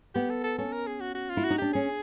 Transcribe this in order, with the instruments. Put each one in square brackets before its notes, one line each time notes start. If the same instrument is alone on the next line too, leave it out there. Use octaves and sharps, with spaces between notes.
[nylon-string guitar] B3 [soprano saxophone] G4
[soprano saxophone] A4
A4
[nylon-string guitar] C#4 [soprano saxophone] A4
[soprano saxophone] A#4
G#4
F#4
F#4
F4
[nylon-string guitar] E4
[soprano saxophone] F#4
[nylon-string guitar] D#4
[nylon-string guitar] D4 [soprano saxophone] G4
[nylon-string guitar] C#4 [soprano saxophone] G#4